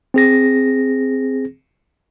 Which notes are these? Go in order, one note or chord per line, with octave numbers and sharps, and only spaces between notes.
C4 G#4 A#6